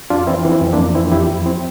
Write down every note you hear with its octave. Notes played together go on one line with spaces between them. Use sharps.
F2 D4 F4
E3 C4 E4
E3 C4 E4
F2
A#3 D4
F2
E3 C4 E4
F2 E4 G4
F2
C4 E4